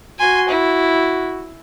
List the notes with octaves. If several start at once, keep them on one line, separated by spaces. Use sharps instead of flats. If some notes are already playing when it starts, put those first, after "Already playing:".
F#4 G#5 C6
E4